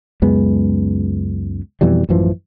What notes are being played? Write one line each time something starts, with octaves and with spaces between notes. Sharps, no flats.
C#2 F#2 G#3 B3
F2 B2 E3 G3
A1 F#2 E3 F3